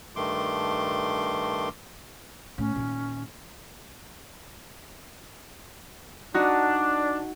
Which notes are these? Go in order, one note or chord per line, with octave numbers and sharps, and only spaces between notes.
G2 D#3 A3 C6 D6
A2 C#4
A#2 D#3
D4 D#4 F#4